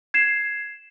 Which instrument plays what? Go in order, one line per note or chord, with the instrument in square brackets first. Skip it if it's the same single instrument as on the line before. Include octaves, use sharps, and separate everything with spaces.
[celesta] G#6 C7 E7